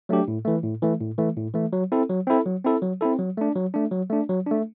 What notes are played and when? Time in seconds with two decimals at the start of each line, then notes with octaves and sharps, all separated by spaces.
0.09 F#3 A3 D4 G4
0.28 A2
0.45 E3 A3
0.64 A2
0.82 E3 A3
1.00 A2
1.18 E3 A3
1.37 A2
1.54 E3 A3
1.73 F#3
1.92 C4 E4 A4
2.09 F#3
2.27 C4 E4 A4
2.46 F#3
2.65 C4 E4 A4
2.82 F#3
3.01 C4 E4 A4
3.19 F#3
3.37 A3 D4
3.55 F#3
3.74 A3 D4
3.91 F#3
4.10 A3 D4
4.29 F#3
4.47 A3 D4